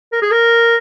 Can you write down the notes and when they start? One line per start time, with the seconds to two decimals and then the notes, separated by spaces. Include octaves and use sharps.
0.12 A#4
0.22 G#4
0.31 A#4